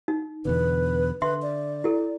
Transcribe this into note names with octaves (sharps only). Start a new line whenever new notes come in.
D#4
E2 B2 D3 B4
D3 B4 E5 C6
D5
E4 A4